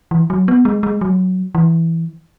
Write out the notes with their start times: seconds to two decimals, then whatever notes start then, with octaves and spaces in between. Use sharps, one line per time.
0.11 E3
0.30 F#3
0.48 B3
0.65 G#3
0.83 G#3
1.01 F#3
1.55 E3